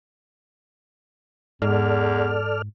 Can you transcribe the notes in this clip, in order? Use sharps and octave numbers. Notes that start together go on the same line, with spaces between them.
E2 G#2 A4 D5 F6